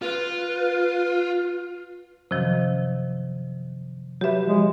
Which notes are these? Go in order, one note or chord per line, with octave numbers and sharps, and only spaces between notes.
F4 B4
F#2 C3 D#3 F3
F#3 G4 B4 E5
F3 F#3 G#3